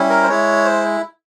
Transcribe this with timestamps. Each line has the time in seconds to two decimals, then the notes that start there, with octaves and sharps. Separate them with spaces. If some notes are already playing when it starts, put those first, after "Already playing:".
Already playing: G3 C#4 E4
0.10 A#4
0.23 C5
0.28 G#3 E4 C#5
0.65 C5